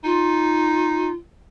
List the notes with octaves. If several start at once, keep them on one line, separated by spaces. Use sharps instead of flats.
D#4 F4